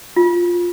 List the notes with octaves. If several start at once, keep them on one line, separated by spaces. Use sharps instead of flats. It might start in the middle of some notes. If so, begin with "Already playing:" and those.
F4